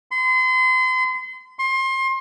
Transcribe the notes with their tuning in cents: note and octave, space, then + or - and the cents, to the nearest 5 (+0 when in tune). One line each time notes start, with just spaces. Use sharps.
C6 -35
C6 +30